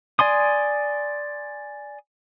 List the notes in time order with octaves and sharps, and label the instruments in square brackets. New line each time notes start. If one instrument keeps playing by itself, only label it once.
[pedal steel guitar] D5 G#5 C6 D#6